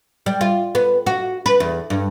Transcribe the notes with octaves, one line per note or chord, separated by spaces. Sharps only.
G3
F4
B3
F#4
B4
E2
G2